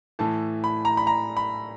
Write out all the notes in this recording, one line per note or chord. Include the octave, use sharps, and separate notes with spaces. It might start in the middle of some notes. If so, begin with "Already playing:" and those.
A2 E3 A5
B5
A#5
B5
A#5
B5